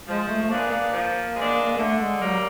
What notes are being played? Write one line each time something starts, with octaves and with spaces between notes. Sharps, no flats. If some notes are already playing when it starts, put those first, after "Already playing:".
F3 G#3
A3
A3
G#3 A#3 B3 D4
A#3
F3
G#3 B3 D4
D3 A3
G#3
F#3 G3 A#3